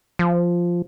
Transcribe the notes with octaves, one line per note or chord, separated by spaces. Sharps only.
F3